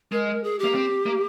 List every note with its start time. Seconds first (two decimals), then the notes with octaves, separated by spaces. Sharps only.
0.12 G#3 A#4
0.44 G#4
0.59 G4
0.64 A#3
0.75 C4
1.06 A#3